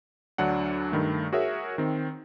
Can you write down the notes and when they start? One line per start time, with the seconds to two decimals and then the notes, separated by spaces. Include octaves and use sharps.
0.38 D2 F#3 D4 F#5
0.92 G2 D#3 A3
1.33 F#4 G#4 A#4 C#5 E5
1.78 D#3 C4